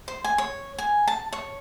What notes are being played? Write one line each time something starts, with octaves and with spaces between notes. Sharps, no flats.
C5
G#5
C#5
G#5
A5
C#5